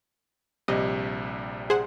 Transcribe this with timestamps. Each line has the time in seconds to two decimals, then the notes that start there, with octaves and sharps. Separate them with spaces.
0.68 A#1 C3 G3 D#5
1.70 G#4 C5 F#5